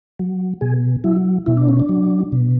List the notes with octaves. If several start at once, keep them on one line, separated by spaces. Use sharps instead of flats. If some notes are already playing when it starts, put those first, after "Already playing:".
F#3
B2 G#4
F#3 E4
B2 E4
D4
C#4
D4
F#3
B2